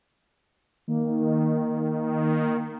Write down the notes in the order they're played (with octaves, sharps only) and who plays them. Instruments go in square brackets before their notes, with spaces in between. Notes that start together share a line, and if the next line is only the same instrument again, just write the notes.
[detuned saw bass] D#3 [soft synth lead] A#3